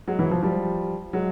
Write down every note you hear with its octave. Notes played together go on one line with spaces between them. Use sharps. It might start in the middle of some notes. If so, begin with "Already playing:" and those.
F#3 G#3
E3 F#3
F3
F3 G3
F#3 G#3